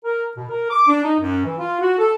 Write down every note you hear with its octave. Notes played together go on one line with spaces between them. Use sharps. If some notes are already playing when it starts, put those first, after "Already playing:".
A#4
B2
A#4
D6
D4
D#4
F#2
E3
F4
F#4
A4